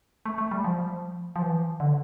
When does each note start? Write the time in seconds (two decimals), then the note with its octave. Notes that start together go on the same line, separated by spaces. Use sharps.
0.26 A3
0.38 A3
0.51 G3
0.64 F3
1.36 F3
1.42 E3
1.80 D3